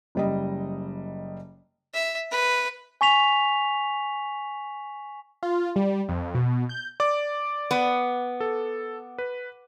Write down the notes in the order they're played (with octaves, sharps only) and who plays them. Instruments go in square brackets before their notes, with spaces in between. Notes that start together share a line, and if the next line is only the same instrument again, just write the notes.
[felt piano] F#1 G3 D#5
[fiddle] E5
B4
[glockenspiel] G#5 C#6 B6 F7
[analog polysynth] F4
G3
F2
B2
G6
[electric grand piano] D5 D6
[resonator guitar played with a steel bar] B3
[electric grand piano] A4
B4